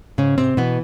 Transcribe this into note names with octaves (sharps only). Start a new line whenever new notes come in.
G#2 C#3 C#4
C3 C4
B2 E3 B3